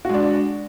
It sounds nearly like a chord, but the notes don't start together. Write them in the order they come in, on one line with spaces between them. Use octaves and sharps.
F#4 G#3 D4